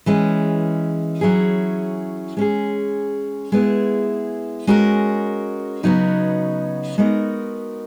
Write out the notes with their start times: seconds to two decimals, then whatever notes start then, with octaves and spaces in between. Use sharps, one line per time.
0.06 E3 G#3 C#4
1.21 F#3 C#4 E4 G#4
2.37 G#3 C#4 G#4
3.52 G#3 B3 E4 G#4
4.67 G#3 C#4 F#4 A#4
5.83 C#3 F#3 B3 D#4 F#4
6.98 G#3 B3 D#4 F#4 A#4